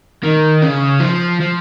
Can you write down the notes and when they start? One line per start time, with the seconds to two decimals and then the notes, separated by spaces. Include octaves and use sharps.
0.24 D#3
0.62 C#3
1.00 F3
1.40 F3